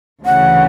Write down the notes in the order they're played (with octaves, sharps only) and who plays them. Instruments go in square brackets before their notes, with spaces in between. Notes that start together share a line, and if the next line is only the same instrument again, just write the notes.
[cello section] D2 C#3 E3 [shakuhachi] F#5